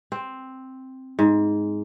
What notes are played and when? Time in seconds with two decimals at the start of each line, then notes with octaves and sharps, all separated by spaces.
0.12 C4
1.19 G#2